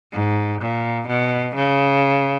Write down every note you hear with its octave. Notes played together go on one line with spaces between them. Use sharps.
G#2
A#2
B2
C#3